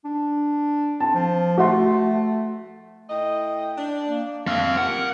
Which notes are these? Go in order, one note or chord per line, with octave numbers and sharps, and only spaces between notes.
D4
C4 A5
F3
A3 F#4 E5 C6
A2 D#5 G5
D4
A#3
G#3 C4 E5 F5 F6
F3 G4 A#4 F#5